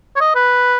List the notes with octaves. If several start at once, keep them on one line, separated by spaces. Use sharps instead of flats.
C#5
D#5
B4